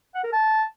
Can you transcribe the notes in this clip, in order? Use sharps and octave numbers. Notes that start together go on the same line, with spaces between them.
F#5
A#4
A5